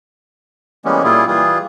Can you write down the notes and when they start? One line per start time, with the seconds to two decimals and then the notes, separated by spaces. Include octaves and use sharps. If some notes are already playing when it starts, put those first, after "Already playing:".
0.85 E3 G3 G#3 A#3 B3 C#4
1.04 A#2 G3 A#3 E4 F4 G#4
1.28 E3 G3 F4 G#4